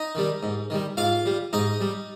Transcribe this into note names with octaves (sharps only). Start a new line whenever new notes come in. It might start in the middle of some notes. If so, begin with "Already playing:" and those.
Already playing: D#4 D#5
D#3 G3
G#2
D#3 G3
G#2 F4 F5
G3
G#2 D#4 D#5
G3